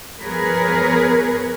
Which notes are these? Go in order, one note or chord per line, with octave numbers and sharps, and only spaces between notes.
F3 B3 G#4 A#4 B4 C#5